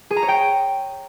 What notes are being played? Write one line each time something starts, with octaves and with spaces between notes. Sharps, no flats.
G#4
A#5
C#5
G5